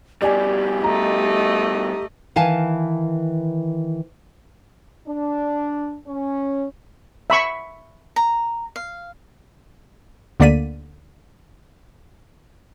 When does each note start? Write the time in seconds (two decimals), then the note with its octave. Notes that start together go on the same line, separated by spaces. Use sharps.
0.22 B2 G3 G4 D5 G#5
0.84 A3 D#5 A#5
2.36 D#3 E3 F5 G#5 A5
5.07 D4
6.07 C#4
7.30 E5 B5 C#6
8.16 A#5
8.76 F5
10.40 D2 D3 A#3 D5 B6 D#7